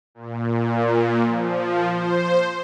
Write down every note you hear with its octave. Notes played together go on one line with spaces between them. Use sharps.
A#2
F3
C5